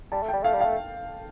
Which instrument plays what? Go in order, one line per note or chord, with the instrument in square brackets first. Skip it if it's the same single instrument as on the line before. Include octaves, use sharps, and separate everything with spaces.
[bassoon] G3 [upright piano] A5
[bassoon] A3
[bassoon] G3 [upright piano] G5
[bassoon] A3 [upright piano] F5
[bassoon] G3
[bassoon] A3 [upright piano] F5